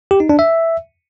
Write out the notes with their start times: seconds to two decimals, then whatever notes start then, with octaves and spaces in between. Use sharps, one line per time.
0.11 G4
0.20 D#4
0.29 D4
0.39 E5